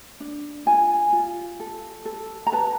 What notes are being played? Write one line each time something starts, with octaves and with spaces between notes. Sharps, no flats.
D4
F4 G#5
F4
A4
A4
A#5
B4 A5